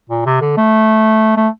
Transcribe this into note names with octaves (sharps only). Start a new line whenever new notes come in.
A#2
C3
D3
A3
A3